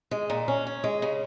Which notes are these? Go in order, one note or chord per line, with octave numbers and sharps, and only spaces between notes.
G#3
A#2
C#4
C#4
G#3
C#3